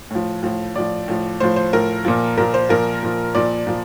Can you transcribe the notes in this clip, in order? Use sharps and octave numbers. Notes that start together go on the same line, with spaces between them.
A2 F3
A2 F3
A2 F3 D5
A2 F3
A2 F3 C5
C5
A2 F3 A#4
A#2 F3
A#2 F3 A#4
C5
A#2 F3 A#4
A#2 F3
A#2 F3 D5
A#2 F3